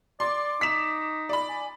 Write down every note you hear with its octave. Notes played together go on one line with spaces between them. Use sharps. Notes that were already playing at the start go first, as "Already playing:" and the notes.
D5 C6 D6
D#4 B6 E7
D5 B5
G#5